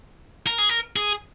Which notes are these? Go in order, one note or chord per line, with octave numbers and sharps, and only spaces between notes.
A#4
G#4
A#4
G#4